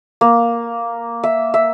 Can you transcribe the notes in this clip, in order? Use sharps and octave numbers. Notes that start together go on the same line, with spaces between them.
A#3
E5
E5